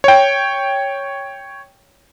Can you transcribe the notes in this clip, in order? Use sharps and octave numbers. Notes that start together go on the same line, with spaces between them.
C#5 G5